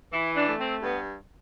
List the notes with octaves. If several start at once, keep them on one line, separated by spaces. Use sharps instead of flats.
E3 E4
D4
A3
C4
G2 B3